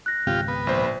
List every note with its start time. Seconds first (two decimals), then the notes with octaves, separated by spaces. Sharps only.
0.06 F#6 A#6
0.27 G#1 C#2 C4 F4 G4
0.48 B3
0.67 A#1 C5